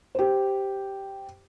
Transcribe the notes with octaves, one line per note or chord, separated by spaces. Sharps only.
G4 C5